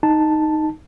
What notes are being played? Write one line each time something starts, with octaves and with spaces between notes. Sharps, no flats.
D#4 A5